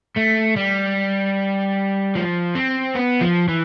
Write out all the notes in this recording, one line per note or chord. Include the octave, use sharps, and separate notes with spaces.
A3
G3
F3
C4
B3
F3
E3